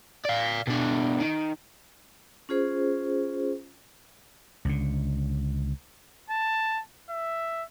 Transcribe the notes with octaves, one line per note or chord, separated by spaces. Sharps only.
D5 F5
B2 D4
D#3
C#4 F4 G#4 C5
C#2 D3
A5
E5